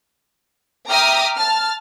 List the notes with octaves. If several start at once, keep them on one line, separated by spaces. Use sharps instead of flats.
E5 G5 A#5 D6 D#6 F6
A5 F6